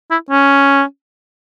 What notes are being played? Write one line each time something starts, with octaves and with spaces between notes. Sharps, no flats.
E4
C#4